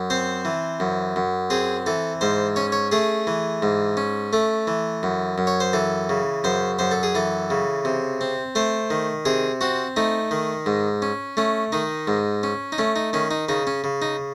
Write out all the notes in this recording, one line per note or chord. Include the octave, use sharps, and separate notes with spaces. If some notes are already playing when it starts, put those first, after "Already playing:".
Already playing: F#2
C4 C5
E3
F#2
F#2
C4 G#4
E3 A4
G#2 C5
C#4 C#5
C#5
A3 G#4
E3
G#2
C#4
A3 A4
E3
F#2
F#2
C#5
C5
E3 A4
C#3
F#2 C5
F#2 C5
A4
G#4
E3 A4
C#3
C3
C4
A3 C5
D#3
C3 G#4
C4 F#4
A3 D#4
D#3
G#2
C#4
A3 C#4
D#3 D#4
G#2
C#4
D#4
A3 C#4
D#4
D#3 C#4
D#4
C#3 D#4
C#4
C#3
D#4